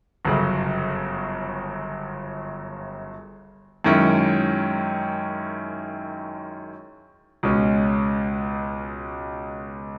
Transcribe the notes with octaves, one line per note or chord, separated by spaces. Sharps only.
G1 F#2 C#3
F#2 D#3 G#3 C#4 E4
C#2 B2 G#3 C#4